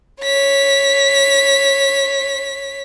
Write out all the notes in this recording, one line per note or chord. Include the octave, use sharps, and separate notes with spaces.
C#5 B6